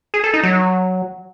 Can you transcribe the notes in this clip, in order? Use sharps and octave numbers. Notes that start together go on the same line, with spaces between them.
G#4
A4
D#4
F#3